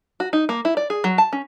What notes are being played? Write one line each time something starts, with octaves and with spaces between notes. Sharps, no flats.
F#4
D#4
A#3
E4
D5
G#4
F#3
A5
C#4